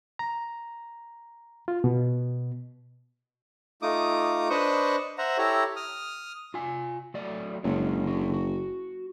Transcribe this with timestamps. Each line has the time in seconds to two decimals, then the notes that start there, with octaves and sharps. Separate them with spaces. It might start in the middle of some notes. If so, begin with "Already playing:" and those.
0.19 A#5
1.68 F4
1.84 B2
3.82 A3 D#4 F4 D6 D#6
4.50 D4 B4 C5 D#5 C#6 D#6
5.18 C5 E5 F#5 A#5
5.38 E4 G4 A4 C#5 A#5
5.76 D#6 F6
6.54 F4 G#5
7.14 F#3 A3 D5
7.64 F#1 D3 G#3 C#5
8.04 D3 F#4
8.34 F#4